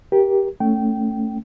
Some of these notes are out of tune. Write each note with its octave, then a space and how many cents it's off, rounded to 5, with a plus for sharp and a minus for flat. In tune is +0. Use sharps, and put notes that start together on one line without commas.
G4 +0 A#4 +25
A3 +15 C#4 +0 G5 -20